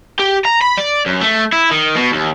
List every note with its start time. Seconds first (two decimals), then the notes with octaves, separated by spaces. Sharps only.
0.19 G4
0.45 A#5
0.61 B5
0.77 D5
1.06 F#2
1.21 A3
1.52 E4
1.71 D#3
1.96 B2
2.12 D#2